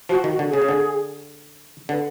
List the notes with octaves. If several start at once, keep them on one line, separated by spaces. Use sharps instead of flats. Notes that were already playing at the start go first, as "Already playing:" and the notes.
F3 F#4
D#3
F#4
D3
C#3 G#4
C#3
D3
D3 B4